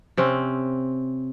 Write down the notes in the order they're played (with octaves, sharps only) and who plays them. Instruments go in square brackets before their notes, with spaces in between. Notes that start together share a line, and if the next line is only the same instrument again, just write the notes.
[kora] C3 C4 C#4